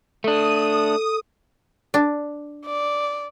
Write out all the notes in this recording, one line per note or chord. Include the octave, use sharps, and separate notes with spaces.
A3 D4 A4 D#6
D4
D5